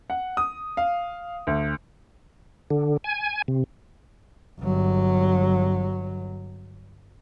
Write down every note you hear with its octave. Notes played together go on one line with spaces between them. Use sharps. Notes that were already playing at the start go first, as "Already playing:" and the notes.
F#5
D#6
F5
D2
D3
G#5
C3
G1 F#3